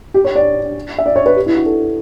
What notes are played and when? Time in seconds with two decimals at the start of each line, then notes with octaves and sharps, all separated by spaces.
0.14 G4
0.25 C#5
0.35 D5
0.98 E5
1.06 D5
1.16 C#5
1.26 B4
1.36 G4
1.46 E4
1.56 F#4
1.66 A4